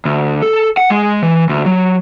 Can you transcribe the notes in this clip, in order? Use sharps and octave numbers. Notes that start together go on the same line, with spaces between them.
D2
A4
F#5
G#3
E3
D2
F#3